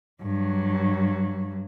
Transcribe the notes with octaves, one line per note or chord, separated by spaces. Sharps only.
G2 F#3